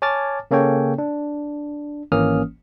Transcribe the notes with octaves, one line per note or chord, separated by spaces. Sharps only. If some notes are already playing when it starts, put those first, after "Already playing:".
C#5 G#5 A5 D6 F6 A6
C#3 A#3 C#4 A4 C#5 G5
D4
G#1 E3 A#3 C#4 D#6 F6